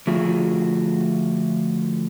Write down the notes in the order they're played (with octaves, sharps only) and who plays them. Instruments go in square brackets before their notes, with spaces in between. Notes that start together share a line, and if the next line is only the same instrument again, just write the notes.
[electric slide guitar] D3 F3 A3 F4 F#4 G#4